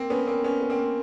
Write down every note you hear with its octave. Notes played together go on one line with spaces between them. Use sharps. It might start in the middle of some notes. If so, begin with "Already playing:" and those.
Already playing: A#3 C4
B3 C#4
A#3 C4
B3 C#4
B3
A#3 C4